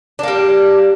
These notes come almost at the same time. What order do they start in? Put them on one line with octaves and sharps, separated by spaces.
D4 A#3 G3